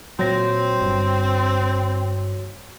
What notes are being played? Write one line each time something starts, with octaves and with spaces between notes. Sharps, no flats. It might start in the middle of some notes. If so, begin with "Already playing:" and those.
A#2 F#3 C4 F#4 C#5 A#6
G1 G2